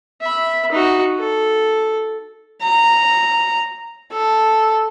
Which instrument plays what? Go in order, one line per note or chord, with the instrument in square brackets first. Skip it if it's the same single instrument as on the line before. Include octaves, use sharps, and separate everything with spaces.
[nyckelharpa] E5 B5
D#4 F#4
A4
[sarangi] A#5
A4